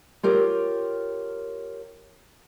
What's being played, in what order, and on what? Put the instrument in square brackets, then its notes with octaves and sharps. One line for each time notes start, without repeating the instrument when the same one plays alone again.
[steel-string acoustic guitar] F4 G4 A#4 C#5